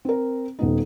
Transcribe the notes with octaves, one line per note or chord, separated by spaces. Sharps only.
C4 A#4
D#1 B3 D#4